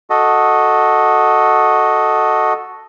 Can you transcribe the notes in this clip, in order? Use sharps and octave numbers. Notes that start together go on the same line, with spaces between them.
F#4 A4 D#5